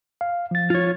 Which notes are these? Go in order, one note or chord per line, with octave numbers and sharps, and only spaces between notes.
F5
F3 A6
F4 C#5